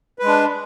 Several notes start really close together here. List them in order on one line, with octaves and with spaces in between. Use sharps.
B4 G#3 D4